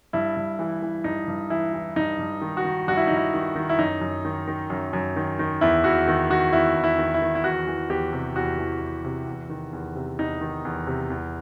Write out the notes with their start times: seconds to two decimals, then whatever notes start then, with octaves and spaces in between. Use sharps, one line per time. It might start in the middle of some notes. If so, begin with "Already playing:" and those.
0.13 G2 E4
0.37 G2
0.59 E3
0.82 E3
1.04 G2 D#4
1.28 G2
1.50 E3 E4
1.73 E3
1.96 G2 D#4
2.19 G2
2.42 D#3
2.57 F#4
2.65 D#3
2.88 G2 F#4
2.97 E4
3.07 G2 D#4
3.17 E4
3.34 D#3
3.56 D#3
3.69 E4
3.78 F#2 D#4
4.01 F#2
4.25 D#3
4.48 D#3
4.70 F#2
4.93 F#2
5.16 D#3
5.39 D#3
5.61 E2 E4
5.84 E2 F#4
6.07 D#3
6.30 D#3 F#4
6.53 E2 E4
6.76 E2
6.84 E4
6.98 D#3
7.14 E4
7.22 D#3
7.35 E4
7.44 E2 F#4
7.67 E3
7.90 E2 G4
8.13 C3
8.36 E2 F#4
8.59 E3
8.81 E2
9.04 C3
9.27 E2
9.49 D#3
9.73 E2
9.95 C3
10.19 E2 D#4
10.41 D#3
10.65 E2
10.87 C3
11.10 E2